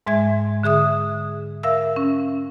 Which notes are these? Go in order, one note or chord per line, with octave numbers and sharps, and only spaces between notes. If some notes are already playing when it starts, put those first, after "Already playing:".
G#2 G#3 E5 G#6
D3 G#4 E5 D#6
A#4 E5 F5 E6
C#4